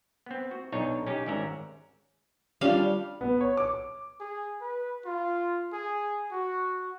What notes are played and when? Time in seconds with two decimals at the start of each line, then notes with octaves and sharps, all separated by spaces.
0.26 B3 C4
0.51 F#4
0.72 B1 D4 D#4 C#5
1.07 C#4 D#4 G4
1.26 G#1 G#2 C#4 D5 E5 A#5
2.61 G3 C#4 D4 F4 F5
3.21 B3
3.41 C#5
3.57 D6
4.20 G#4
4.61 B4
5.05 F4
5.73 G#4
6.32 F#4